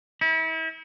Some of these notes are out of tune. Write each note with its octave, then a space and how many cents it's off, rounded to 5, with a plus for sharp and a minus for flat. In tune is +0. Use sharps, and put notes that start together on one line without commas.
E4 -35